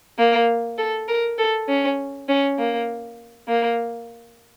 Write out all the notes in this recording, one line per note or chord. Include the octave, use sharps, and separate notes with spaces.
A#3
A4
A#4
A4
C#4
C#4
A#3
A#3